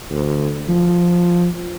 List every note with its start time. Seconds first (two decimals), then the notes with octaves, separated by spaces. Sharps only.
0.11 D2
0.69 F3